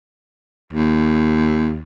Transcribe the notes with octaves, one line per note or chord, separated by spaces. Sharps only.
D#2